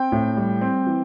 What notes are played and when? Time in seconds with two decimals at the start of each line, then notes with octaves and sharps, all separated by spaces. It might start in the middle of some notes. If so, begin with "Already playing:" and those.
Already playing: C4 G5
0.12 A2
0.37 G3
0.61 C4
0.86 E3